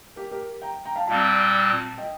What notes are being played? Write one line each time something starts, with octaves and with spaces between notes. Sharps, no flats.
G4 A#4
G4 A#4
G5 A#5
G5 A#5
F5 A5
A#2 G3 C4 F5 A5
D#5 G5